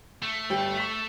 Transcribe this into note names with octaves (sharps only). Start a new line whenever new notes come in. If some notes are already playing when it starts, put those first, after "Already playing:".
A3
G1 G3 G5
C#6 B6